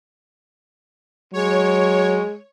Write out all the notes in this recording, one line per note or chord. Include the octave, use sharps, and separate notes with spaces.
F#3 G#3 C#5